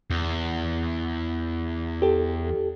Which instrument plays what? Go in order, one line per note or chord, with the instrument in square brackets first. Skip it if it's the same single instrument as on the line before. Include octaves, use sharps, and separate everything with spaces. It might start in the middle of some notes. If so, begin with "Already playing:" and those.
[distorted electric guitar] E2
[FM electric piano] G4 A4